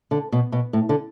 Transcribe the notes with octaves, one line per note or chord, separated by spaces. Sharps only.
D3
B2
B2
A2
D3